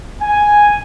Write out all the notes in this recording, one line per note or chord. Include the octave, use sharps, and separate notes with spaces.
G#5